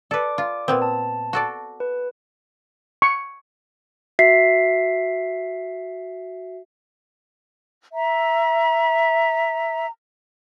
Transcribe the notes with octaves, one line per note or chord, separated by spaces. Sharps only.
A4 B4 D5 D6
F4
A#2 B3 C4
A5
F#4 A4 D5
B4
C#6
F#4 E5 B6 C7
E5 A#5